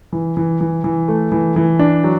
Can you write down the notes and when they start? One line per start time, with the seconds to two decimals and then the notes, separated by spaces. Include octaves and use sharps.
0.13 E3
0.37 E3
0.61 E3
0.84 E3
1.08 A3
1.32 E3
1.56 E3
1.79 D4
2.04 F#3